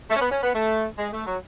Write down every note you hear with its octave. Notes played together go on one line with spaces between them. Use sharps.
A3
C#4
B3
C#4
B3
A3
G#3
A3
F#3